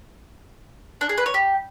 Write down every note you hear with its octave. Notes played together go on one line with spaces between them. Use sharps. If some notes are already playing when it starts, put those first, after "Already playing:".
D4
G#4
B4
C#5
G4